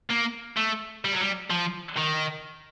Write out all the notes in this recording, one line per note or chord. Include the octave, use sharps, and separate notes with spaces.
A#3
A3
G3
F#3
G3
F3
D#3